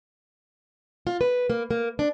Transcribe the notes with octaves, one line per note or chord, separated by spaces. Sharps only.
F4
B4
A#3
A#3
D4